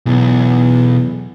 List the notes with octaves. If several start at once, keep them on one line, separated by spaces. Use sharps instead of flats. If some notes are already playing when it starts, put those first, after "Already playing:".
B1 E2